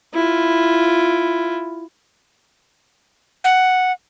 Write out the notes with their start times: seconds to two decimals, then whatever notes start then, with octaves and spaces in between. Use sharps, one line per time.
0.14 E4 F4
3.44 F#5